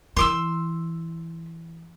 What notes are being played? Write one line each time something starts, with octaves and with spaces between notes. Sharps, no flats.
E3 C6 D6 E6